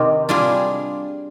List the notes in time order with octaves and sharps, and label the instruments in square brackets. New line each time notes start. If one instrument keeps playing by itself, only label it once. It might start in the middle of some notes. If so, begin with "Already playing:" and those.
Already playing: [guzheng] C3 [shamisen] D#3
[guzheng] G3 D4 F4 G#4